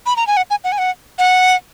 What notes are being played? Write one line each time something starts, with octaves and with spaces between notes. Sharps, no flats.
B5
A#5
G#5
F#5
G#5
F#5
G#5
F#5
F#5